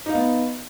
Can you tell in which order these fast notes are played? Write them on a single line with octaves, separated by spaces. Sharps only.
D#4 F5 B3